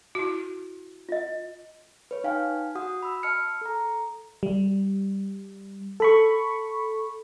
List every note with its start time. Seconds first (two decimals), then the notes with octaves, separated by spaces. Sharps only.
0.15 E4 F#4
1.09 F4 D#5
2.11 B4 C#5
2.24 D#4 F5 G5 G#5 F6
2.75 F#4 F#5 D#6
3.03 B5 E6
3.23 D#5 A5 E6 F6 C#7
3.61 A4 A#5
4.43 G3
6.00 A4 B5 C#6